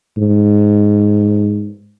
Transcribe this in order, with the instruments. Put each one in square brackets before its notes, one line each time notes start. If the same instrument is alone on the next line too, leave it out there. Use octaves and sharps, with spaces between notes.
[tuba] G#2